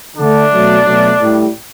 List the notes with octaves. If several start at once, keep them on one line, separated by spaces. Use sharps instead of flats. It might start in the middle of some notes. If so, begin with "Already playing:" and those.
D3 A3 D4
B2 F#3 A3
B2 F#3 A3
A2 G3